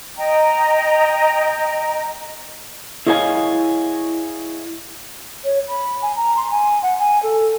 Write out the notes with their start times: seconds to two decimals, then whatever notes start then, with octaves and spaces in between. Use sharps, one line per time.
0.17 D#5 G5 A#5
3.07 E4 G#4 C#5 D#5 F5 G#5
5.44 C#5
5.67 B5
6.02 G#5
6.16 A#5
6.36 C6
6.50 G#5
6.82 F#5
6.99 G#5
7.23 A4